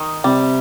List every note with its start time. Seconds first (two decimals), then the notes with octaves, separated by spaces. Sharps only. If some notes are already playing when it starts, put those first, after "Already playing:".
Already playing: D#3 D#4
0.24 C3 G3